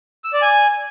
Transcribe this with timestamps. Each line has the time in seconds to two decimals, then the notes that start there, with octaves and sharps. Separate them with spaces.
0.24 E6
0.33 D5
0.42 G#5